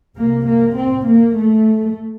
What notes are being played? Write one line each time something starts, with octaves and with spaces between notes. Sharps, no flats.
C2 C3 A#3
A#3
C4
A#3
A3